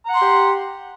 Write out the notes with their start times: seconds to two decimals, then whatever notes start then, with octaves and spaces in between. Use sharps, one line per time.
0.05 A#5
0.09 F#5
0.14 C6
0.18 G4